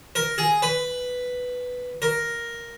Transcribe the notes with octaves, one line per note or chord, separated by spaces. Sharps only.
A#4
G#4
B4
A#4